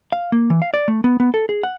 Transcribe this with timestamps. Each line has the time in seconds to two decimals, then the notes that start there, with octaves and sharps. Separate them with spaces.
0.12 F5
0.32 A#3
0.50 E3
0.62 F5
0.74 D5
0.88 A3
1.04 B3
1.20 B3
1.34 A4
1.49 G#4
1.63 F#5